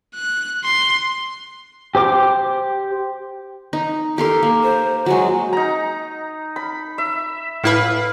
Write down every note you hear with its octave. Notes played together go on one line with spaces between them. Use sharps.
F#6
C6
G4 C5 D6
D#4
G4 A4 A#4 C6
A#3
C5
F#3 G#3 F#4
D#4 A#5
B5
E5
A2 E4 B4 F5 B5